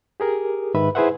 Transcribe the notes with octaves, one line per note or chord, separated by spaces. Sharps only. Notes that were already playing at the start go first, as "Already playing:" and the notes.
G4 G#4 A#4
G#2 D#3 B4 E5 B5
E4 G#4 B4 C5 E5 F#5